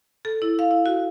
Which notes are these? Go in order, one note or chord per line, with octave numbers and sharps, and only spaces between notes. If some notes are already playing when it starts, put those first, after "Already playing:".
A4
E4
F5
E4
F#4